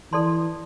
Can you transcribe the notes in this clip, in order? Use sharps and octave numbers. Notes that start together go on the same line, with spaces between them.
E3 A4 D5 A5 C6